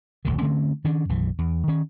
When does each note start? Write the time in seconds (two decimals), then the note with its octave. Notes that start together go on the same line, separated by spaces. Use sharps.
0.25 F1 D2 A#2 D#3
0.38 D3 A3 C4 C#4
0.84 D#3 C#4 D4
1.09 B1 F#2 E3
1.39 E2
1.68 D#3 C#4